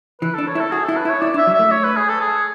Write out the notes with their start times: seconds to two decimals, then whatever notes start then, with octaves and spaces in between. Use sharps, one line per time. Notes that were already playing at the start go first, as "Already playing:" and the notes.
0.22 E3 B4
0.34 D4 A4
0.47 C#5
0.55 E4
0.60 A4
0.71 F#4 G#4
0.84 E4 A4
0.97 B4
1.05 E4
1.10 C#5
1.21 E4 D5
1.34 D4
1.38 E5
1.47 F#3
1.54 A3 E5
1.71 C#5
1.84 B4
1.96 G#4
2.09 A4
2.21 G#4